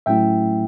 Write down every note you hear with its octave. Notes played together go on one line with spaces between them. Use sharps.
A2 F#3 A3 C#4 E4 E5 G5